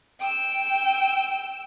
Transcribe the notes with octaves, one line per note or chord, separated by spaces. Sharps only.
G5 E6